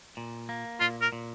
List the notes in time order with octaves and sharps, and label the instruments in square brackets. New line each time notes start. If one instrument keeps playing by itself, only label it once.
[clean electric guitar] A#2
A#3
[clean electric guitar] A#2 [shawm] F4
[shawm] A#4
[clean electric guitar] A#2